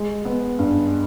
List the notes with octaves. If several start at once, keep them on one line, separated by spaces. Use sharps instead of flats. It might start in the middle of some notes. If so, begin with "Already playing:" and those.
Already playing: G#3
B3
G2